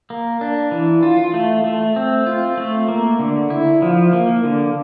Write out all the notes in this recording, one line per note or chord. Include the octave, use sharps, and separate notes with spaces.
A#3
D4
E3
F4
A3
A3
C4
F4
A3
A#3
D3
E4
F3
A#3
D3